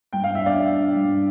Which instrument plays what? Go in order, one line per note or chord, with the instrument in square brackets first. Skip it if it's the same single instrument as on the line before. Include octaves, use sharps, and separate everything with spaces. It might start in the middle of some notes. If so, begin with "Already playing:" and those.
[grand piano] G2 [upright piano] G5
[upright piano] F5
[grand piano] D4 [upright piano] E5
[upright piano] D5 F5
[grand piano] D4
G2